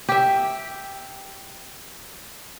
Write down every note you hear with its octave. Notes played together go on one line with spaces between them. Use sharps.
G4 E5